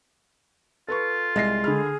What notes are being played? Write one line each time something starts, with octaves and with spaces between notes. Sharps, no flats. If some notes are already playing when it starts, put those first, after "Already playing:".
F4 A4 B4 C#6
C2 G#3 A#6 C7
D3 G#4 B5 F6